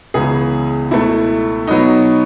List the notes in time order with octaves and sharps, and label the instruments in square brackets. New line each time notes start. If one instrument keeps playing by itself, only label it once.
[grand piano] C#2 C#3 E3 B3 G#4
C#2 B2 A3 E4
B2 F#3 B3 D#4